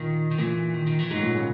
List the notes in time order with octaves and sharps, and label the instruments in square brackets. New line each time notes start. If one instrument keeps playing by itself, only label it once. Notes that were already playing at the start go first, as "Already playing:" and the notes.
Already playing: [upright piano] A#2 [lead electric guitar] D#3
[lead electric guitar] D#3
[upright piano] A#2 [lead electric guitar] E3
[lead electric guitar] D#3
D#3
E3
[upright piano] G#2 [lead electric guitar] F#3
[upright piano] A#2
C#3